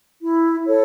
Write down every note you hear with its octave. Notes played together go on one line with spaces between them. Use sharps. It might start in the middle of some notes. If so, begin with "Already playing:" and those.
E4
A4 C#5